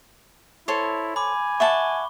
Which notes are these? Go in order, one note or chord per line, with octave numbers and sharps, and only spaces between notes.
E4 A4 C5 C#5
G#5 B5 D6
E5 F#5 A5 C#6 G7